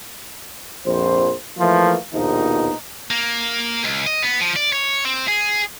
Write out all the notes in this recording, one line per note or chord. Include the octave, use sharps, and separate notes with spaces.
A#1 F2 C5
E3 F3 A3 A#3 F4
A#1 D#2 B2 F3 D#4
A#3
C#2
D#5
B3
F3
D5
C#5
C4
G#4